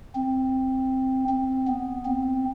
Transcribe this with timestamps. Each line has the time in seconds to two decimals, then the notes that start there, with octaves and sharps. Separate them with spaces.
0.15 C4
1.29 C4
1.67 B3
2.05 C4